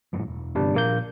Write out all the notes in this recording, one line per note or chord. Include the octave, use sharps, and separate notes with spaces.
A#1 F#2 A2
E1
G1 G2 C3 G3 D4
A#1 A#2 A#3 G6